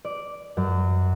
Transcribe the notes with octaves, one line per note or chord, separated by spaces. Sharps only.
D5
F#2